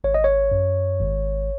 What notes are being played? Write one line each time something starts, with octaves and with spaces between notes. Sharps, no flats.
G#1 C#5
D#5
C#5
F#2
G#1